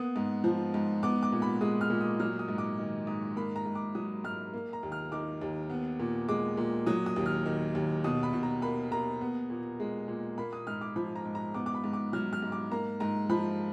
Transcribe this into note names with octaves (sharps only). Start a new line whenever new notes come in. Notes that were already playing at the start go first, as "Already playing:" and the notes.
Already playing: A#3 B3 D#6
G#2
F3
G#2
B3 D6
D6
A#2
B5
G#3 D#6
F6
A#2
D#6
F#3 F6
D#6
G#2
D6
D#3
G#2 D#6
A#3 B5
A#5
G#2
D6
F#3 D#6
G#2 F6
A#3
A#5
D#2
F6
D#3 D6
D#2
B3
A#2
G#3 D6
A#2
F#3 D#6
D#6
D#2
F6
D#3
D#2
B2 D#6
B5
B2
A#5
A#3 B5
A#3 A#5
B3
A#2
G#3
A#2
A#3 B5
D#6
G#2 F6
D6
F3 B5
A#5
G#2
A#5
B3 D6
D6
B5
G#2
D6
F#3 F6
F6
G#2
D6
A#3 A#5
G#2 A#5
F3 B5